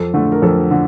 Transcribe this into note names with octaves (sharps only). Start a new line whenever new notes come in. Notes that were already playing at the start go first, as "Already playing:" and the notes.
Already playing: F2 A4
D3 A3
A#4
F2 A4
D3